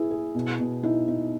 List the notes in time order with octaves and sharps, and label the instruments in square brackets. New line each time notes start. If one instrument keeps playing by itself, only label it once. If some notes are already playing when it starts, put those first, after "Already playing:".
Already playing: [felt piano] E4 [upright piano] G#4 B4
[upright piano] G#4
B2
B2
[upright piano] D#4 [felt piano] E4
[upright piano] D#4